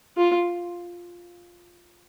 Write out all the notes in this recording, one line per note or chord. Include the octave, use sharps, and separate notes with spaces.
F4